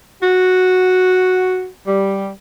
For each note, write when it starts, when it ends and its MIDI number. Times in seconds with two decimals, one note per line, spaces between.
0.22 1.67 66
1.85 2.28 55